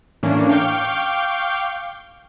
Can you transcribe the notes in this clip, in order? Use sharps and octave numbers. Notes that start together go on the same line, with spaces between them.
A2 E3 A#3 C#4 D4
F5 G5 C#6 D6 G6